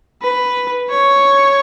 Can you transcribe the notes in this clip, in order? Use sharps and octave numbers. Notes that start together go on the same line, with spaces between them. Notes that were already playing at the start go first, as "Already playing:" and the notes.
B4
C#5